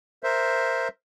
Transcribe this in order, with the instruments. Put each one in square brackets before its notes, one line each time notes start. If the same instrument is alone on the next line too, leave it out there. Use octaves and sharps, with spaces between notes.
[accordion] A#4 C5 E5